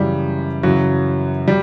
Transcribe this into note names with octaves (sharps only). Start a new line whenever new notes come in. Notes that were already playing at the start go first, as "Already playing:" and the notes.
Already playing: F#2 C#3 E3 G3
F#2 C#3 E3 F#3
G3